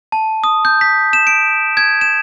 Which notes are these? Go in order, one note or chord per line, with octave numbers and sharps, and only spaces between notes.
A5
D#6
G6
B6
E7
D7
G#6
E7